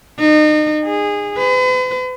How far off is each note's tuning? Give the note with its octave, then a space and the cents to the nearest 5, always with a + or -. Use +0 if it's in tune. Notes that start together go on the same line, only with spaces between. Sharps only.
D#4 -35
G#4 -20
B4 +45